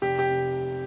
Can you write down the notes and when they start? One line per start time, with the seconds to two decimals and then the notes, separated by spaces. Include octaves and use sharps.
0.02 F1 G4
0.19 G4
0.27 C3